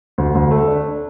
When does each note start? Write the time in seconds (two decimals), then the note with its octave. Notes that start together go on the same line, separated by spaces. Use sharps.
0.18 D2
0.35 D2
0.51 A3
0.68 D4
0.84 D4